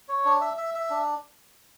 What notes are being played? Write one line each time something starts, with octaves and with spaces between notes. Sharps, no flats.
C#5
D4
E5
E5
E5
D4